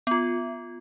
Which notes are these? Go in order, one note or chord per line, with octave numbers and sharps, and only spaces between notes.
B3 F4